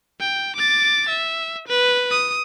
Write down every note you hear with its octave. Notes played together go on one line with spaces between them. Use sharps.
G5
D6 A6
E5
B4
D#6